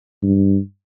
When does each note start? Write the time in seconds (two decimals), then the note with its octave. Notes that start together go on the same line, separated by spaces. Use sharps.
0.23 G2